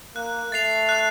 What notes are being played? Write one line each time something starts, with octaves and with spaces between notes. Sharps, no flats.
A#3 F#6
A3 A6 C7 F7
F#6